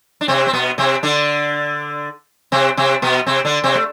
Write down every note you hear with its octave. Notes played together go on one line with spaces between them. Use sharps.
D4
C3 C4
C4
B2 B3
C3 C4
D3 D4
C3 C4
C3 C4
B2 B3
C3 C4
D3 D4
C3 C4
A3